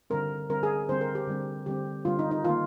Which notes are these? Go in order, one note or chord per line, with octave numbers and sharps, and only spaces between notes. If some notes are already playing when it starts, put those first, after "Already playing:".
D3 G3 C4 A#4
D3 G3 C4 A#4
G#4
D3 G3 C4 C5
A#4
G4
D3 G3 C4
D3 G3 C4 G4
D3 G3 C4 F4
D#4
D#4
D#3 A#3 F4